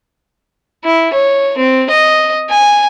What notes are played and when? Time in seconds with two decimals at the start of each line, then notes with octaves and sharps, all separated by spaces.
0.85 E4
1.13 C#5
1.58 C4
1.90 D#5
2.49 G#5